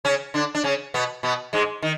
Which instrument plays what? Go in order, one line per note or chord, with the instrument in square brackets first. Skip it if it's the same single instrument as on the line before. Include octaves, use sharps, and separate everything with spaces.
[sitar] C#3 C#4
D3 D4
D4
C#3 C#4
B2 B3
B2 B3
G#2 G#3
D#3